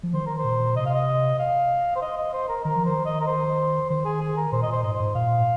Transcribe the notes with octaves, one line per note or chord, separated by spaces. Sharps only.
F3
D#3 C5
A#4
C5
A#2
C3 D#5
F5
D#5
F5
C5
D#5
D#5
C5
A#4
D#3 A#4
F3
D#3 C5
D#5
A#4
C5
D#3 C5
G#4
G#4
A#4
A#2 C5
D#5
A#2 C5
G#2 D#5
C5
G#2
A#2 F5